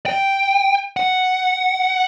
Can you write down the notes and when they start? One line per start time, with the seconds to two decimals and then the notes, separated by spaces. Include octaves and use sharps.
0.06 G5
0.97 F#5